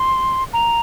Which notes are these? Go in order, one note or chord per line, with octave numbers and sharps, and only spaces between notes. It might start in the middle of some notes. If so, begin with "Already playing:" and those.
Already playing: C6
A#5